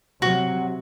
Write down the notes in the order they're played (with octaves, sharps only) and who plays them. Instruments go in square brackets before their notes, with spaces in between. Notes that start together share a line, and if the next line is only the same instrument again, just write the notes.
[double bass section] C3 F#3 [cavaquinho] F#4